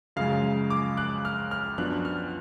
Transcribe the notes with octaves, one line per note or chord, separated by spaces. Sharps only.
F#2 C#3 F3 G#3 F5
D6
F#6
F6
F6
F#2 F3 B3 D4 F#4 F#6
F6